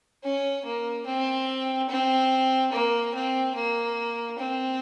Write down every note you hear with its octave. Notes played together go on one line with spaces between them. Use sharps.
C#4
A#3
C4
C4
A#3
C4
A#3
C4